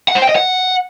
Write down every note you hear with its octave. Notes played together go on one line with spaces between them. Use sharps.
F#5
C5
G5
D#5
F#5